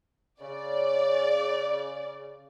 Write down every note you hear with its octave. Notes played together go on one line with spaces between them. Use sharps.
C#3 D5